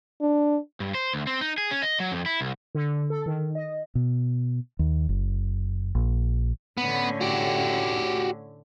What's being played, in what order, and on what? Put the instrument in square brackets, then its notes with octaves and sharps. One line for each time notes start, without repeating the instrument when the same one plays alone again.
[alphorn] D4
[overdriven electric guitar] G2
C5
D2
C4
D#4
G#4
C#4
D#5
F#3
F2
E4
C2
[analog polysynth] D3
A4
D#3
D#5
[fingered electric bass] B2
D#2
F#1
A#1
[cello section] A2 D3 C#4 [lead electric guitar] B3
[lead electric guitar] F#4 G4